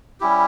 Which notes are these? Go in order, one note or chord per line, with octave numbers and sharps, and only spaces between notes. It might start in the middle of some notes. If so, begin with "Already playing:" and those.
G3 C#4 E4 G4